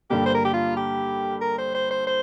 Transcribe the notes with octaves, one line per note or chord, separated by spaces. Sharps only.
G2 D3 G3 A#3 G4
C5
A#4
G4
F4
G4
A#4
C5
C5
C5
C5